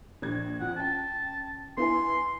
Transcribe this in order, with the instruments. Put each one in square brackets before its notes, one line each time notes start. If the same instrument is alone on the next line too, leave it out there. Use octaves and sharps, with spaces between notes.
[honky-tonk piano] A#1 D4 G#6
[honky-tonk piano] F2 [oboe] F#5
[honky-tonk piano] C#4 G5 [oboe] A5
[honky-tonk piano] B3 E4 G#5 [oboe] C6